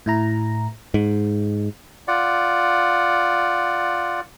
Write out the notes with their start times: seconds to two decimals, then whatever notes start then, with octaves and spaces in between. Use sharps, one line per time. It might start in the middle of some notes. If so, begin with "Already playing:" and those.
0.06 A2 E4 A#5
0.94 G#2
2.08 F4 D5 F#5